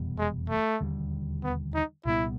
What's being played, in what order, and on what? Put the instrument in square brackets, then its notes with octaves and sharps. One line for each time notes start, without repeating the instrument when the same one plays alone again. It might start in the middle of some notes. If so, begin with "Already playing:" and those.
Already playing: [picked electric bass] F1 E2 B2 G3
[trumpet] G#3
A3
[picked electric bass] E1 D#2 D3 G3
[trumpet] B3
D#4
[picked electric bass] C2 A#2 G3 B3 [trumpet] E4